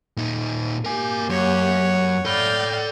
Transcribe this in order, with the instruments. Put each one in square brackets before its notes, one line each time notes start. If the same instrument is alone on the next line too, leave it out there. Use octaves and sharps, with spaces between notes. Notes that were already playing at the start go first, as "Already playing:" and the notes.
[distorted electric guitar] A#2 D#4
[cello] A#3 G4 [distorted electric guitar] A#4 G#5
[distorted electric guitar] F#2 [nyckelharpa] C#5 F#5
[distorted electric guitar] A4 B5 [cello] D5 G5 [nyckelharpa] F5